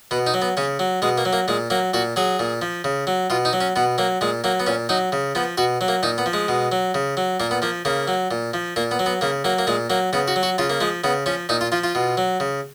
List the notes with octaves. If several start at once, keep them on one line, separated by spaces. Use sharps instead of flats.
B2 B3
D#4
F#3
B3
C#3 C#4
F#3
B2 G#3
A#3
F#3
A#3
A#2 G#3
F#3 A#3
A#2 F#4
F#3 G#4
A#2
F3
C#3
F#3
B2 F4
D#4
F#3
C#4
B2 B3
F#3 A#3
A#2 G#3
F#3 A#3
B3
A#2 C#4
F#3 D#4
C#3
F3 B3
B2 F#4
F#3
A#3
A#2 D#4
B3
F3
G#3
B2
F#3
C#3
F#3
A#2 A#3
B3
F3 A#3
C#3 A#3
F#3
A#2
F3
A#2 A#3
B3
F#3
B3
C#3 A#3
F#3 A#3
A#3
A#2 G#3
F#3 A#3
C#3 B3
F#4
F#3
F#4
C#3 F4
A#3
F3 G#3
C#3 B3
F3 C#4
A#2 D#4
F4
F3 F4
F4
B2
F#3
C#3